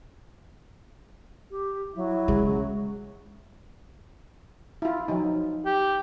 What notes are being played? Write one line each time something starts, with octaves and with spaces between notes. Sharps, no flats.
G4
F#3 E4
C#3 G#3
E4 F4
F3 F#3 D#4
G4